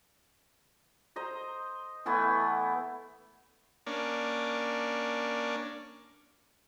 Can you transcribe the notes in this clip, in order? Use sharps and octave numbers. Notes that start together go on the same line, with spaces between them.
C5 D#5 A#5
E3 A3 B3 E4
A#3 C#4 D4